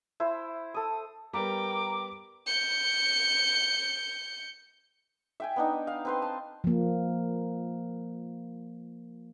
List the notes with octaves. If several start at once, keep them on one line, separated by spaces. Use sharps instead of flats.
E4 C5
A4 D#6
G3 B3 A#4 G5 A#5 D6
G6 C#7
E5 G5 G#5
B3 D4 D#4
F5
C4 B4 C6
A5
F3 A#3